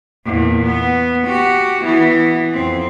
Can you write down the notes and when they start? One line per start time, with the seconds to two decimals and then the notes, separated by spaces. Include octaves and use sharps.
0.26 E2 A#2
0.65 B3
1.26 F#4 G4
1.84 E3 B3
2.53 F2 C4